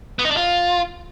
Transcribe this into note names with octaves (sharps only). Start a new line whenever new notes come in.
B3
D#4
D4
F4